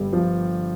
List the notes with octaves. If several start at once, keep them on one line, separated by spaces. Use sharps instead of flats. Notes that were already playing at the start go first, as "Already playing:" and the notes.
Already playing: G1 G2 D3 G3
G1 F3